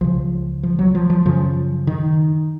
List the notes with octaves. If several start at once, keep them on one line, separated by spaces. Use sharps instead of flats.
C#2 C#3 F3
F3
F#3
F3
F3
F#2 C#3 F3
D#3